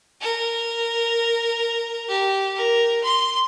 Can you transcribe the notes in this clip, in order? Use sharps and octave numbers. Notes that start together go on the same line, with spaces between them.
A#4
G4
A#4
C6